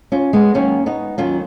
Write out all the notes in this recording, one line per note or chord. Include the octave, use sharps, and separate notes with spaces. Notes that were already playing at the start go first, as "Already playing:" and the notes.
C#4 F4
G#3 B3
D#2 D#3 F#3 A#3 C#4
B3 D#4
D#2 D#3 F#3 C#4 F4